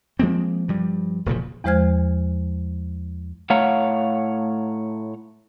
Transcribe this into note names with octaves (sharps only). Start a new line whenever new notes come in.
F3 G#3 A#3 C4
G2 F3 G3
E1 A#2 C#3 F3
E2 F3 G#3 C5 F6 G#6
A2 A3 C#5 F5 F#5 A#5